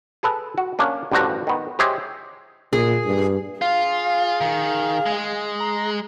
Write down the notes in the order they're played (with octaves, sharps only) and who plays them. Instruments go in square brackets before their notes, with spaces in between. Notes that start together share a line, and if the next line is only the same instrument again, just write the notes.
[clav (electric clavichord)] G#4 A4 B4 A5
F#4
A#3 C#4 D4
A1 G2 D3 F3 F#4 A#5
D#3 B3
G4 G#4 C5 C#5 D#5 E5
[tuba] A#2 [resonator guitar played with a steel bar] G#4
[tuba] G2
[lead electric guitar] F4 [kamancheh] G#4 [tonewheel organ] F5
[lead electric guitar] D#3
G#3
[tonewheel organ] A#5